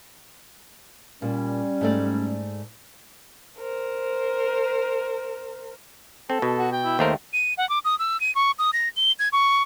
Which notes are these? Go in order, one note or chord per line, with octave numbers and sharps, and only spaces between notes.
A#2 G3 C#4
G#2 A3 D5
A#4 C5
C4 A4
B2
F#4
G5
E4
D#2 A3 A#4 C5
D#7
F#5
D6
D#6
E6
D#7
C#6
D#6
A#6
G7
G#6
C#6